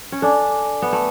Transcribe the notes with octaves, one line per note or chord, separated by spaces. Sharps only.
C#4
D4 A4 D5 G#5 D6
B3
A3